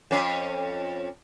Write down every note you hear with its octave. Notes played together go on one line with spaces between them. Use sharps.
F2 C#4